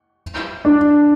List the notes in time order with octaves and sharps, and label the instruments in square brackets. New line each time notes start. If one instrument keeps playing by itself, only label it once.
[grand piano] D4